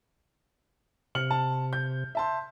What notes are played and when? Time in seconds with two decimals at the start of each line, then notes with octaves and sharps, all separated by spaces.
1.15 C3 F6 C#7 F#7
1.31 A5
1.73 G6
2.15 E5 A5 C6